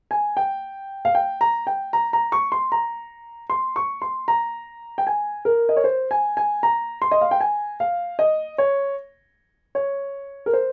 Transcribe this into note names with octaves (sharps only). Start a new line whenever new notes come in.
G#5
G5
F5
G5
A#5
G5
A#5
A#5
C#6
C6
A#5
C6
C#6
C6
A#5
G5
G#5
A#4
D#5
C#5
C5
G#5
G#5
A#5
C6
D#5
F5
G5
G#5
F5
D#5
C#5
C#5
A#4
C5